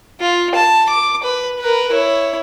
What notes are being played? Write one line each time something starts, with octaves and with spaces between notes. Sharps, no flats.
F4
A5
D6
B4
A#4 B4
E4 C#5